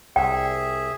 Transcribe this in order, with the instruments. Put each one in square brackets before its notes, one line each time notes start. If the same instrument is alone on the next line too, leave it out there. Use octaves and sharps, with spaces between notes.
[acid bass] C2 [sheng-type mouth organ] G#4 E5 [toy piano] G5